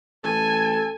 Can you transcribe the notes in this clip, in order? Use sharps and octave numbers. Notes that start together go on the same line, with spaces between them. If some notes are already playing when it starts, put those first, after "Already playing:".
A1 A4 G#5